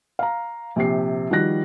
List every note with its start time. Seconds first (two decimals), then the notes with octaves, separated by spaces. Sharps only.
0.19 F5 A#5
0.76 A#1 C3 G4 C7
1.31 D#3 F3 G3 F#4 F#6 A#6